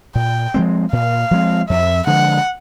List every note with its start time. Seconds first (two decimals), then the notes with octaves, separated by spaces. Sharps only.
0.15 A#2 G5
0.54 F3 G#3 C4
0.92 A#2 F5
1.31 F3 G#3 C4
1.69 F2 E5
2.07 D3 F3 G#3 F#5